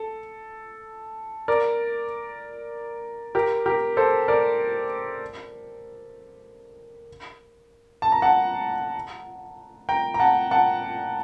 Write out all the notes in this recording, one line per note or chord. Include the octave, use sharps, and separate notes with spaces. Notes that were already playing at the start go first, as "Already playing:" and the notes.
Already playing: A4
A#4 D5
G4 A#4
G4 A#4
A4 C5
A#4 D5
A5
A#5
F#5 A5
G5 A#5
A#5
F#5 A5
F#5 A5